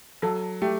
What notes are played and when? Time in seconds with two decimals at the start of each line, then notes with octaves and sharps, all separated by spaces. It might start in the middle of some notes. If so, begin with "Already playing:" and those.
0.22 F#3 A4
0.62 A3 G4